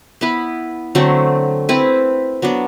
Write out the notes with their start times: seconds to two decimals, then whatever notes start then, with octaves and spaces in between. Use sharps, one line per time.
0.21 B3 E4 B4
0.95 D3 F#3 A3 C4
1.69 C4 E4 B4
2.42 F#3 B3 D4